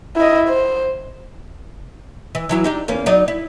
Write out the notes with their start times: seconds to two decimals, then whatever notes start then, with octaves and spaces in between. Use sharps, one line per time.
0.16 E4 D#5
0.49 C5
2.35 E3
2.49 E3 F#3 E4
2.64 D4 D#4 G4
2.88 E2 A#3 C#4
3.06 F#3 D#4 D5
3.28 E4